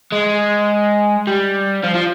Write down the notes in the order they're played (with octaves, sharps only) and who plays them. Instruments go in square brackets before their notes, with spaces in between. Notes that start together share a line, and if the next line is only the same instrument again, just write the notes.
[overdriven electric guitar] G#3
G3
F3
F3